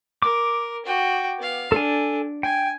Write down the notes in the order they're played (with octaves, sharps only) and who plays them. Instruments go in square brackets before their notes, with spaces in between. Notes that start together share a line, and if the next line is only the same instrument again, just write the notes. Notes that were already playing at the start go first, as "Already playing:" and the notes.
[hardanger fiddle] A#4 [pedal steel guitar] D6
[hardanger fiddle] F#4 G5
B3 F5
[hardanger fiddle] D4 [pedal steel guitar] A4 G#5
[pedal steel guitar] G5 [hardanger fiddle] G#5